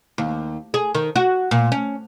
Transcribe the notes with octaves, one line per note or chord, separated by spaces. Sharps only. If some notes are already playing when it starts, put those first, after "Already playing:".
D#2
G#4
D#3
F#4
A#2
C#4